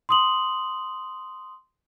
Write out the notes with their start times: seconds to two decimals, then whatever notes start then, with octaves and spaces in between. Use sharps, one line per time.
0.09 C6 D#6 F#7